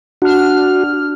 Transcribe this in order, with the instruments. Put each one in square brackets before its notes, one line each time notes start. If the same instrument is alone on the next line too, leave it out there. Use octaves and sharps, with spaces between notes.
[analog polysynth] D4 F6 [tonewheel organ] F#4